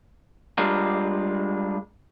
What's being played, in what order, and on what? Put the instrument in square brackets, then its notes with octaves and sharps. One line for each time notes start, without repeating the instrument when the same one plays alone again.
[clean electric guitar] G3 G#3 D4 F4 A#4